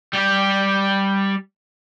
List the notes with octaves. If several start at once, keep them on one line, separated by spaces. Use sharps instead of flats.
G3 G4